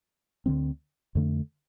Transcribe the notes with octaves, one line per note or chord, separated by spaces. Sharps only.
D2 D3 F3 C4
F2 D3 A3